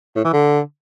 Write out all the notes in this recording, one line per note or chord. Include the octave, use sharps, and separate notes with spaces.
A2
E3
D3